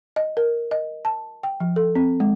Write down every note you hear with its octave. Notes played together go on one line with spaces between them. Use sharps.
D#5
A#4
D#5
A5
G5
F3
A4
C4
G#3